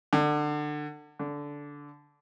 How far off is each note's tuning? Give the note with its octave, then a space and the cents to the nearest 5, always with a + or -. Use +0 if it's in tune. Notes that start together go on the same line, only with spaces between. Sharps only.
D3 +25
D3 -15